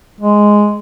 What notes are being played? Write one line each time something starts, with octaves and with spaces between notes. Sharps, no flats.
G#3